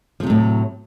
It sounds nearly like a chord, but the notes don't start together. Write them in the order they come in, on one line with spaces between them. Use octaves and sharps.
F3 C3 F#3 A2